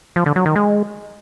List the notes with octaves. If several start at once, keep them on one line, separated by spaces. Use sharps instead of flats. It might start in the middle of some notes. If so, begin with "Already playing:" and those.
F3
D3
F#3
D#3
G#3